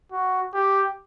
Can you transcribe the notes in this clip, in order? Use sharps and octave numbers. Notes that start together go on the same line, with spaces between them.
F#4
G4